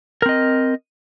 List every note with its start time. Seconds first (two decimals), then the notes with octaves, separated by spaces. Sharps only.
0.22 A#4
0.26 C4
0.29 D#5